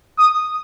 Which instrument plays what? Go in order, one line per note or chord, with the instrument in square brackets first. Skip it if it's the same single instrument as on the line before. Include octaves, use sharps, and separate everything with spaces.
[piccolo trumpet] D#6